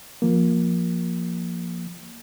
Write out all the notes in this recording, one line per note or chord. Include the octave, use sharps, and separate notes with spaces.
F3 A#3